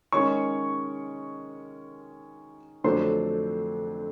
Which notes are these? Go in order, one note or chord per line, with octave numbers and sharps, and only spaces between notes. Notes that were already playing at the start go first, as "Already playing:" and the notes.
D#3 G#3 C#4 C#5 C#6
F2 D3 F#3 A3 D4 C5 C6